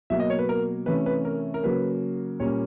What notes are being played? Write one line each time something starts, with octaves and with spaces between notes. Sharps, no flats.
B2 F#3 A#3 E5
D#5
C#5
B4
A#4
C3 E3 A3 C#4 B4
B4
A#4
A#4
C#3 F#3 A#3 B4
A#2 G3 A#3 C#4 C#5